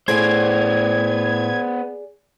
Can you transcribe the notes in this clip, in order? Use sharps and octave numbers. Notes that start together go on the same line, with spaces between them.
A2 B3 G#4 C5 D5 G#6